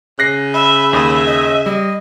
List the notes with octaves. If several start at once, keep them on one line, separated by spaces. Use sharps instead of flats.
C#3 F#6 A#6 C7
E5 B5
D#2 E5 D#6
D#5
G3 D#5